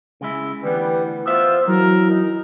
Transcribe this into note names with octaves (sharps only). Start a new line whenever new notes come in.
C#3 G#3 E4
D2 E3 G3 B3 B4
B3 F4 C5 E5 E6
E3 F#3 E4 A#4
D#4